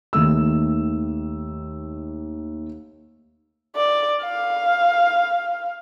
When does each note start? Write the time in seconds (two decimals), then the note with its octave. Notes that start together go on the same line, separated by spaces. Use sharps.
0.13 D#2 D#3 A3 E6
3.76 D5
4.22 F5